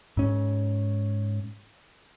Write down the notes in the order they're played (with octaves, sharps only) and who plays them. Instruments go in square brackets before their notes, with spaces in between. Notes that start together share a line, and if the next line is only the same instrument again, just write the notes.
[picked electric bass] G#2 C#4